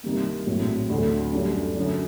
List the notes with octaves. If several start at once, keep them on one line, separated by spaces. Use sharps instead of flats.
C2 C3 D#3 G3 A#3
A#1 A2 F#3 C4
D2 D3 F#3 A3
F#2 D3 G3 D4
F#2 D3 F#3